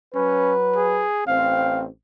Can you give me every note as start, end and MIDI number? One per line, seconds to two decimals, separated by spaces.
0.15 1.07 54
0.15 0.54 61
0.15 1.07 71
0.76 1.25 68
1.27 1.87 33
1.27 1.87 60
1.27 1.82 77